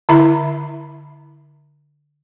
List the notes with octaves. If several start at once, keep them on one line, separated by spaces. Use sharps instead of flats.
D3 E4 E5 B5